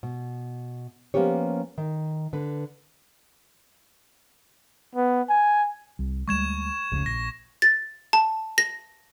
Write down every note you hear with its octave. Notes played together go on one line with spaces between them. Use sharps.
B2
F3 A#3 B3 C#4 G4 C#5
D#3
D3 B4
B3
G#5
C2
D2 G3 G#3 C#6 G#6 E7
F1 C#2 C#3
A#1 A#6
A6
A5
A#6